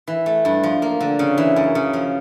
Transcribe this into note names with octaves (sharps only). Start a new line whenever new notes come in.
E3
A3
G2
F3
A#3
D3
C#3
E3
F#2
C#3
F3